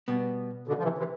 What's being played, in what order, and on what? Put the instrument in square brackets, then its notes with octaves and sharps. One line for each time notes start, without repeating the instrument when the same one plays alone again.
[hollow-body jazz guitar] B2 G3 B3
[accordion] B2 D3
F3
C3 E3
C3 E3